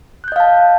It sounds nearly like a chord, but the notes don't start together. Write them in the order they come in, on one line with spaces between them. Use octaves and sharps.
F#6 G6 D#5 F5 A5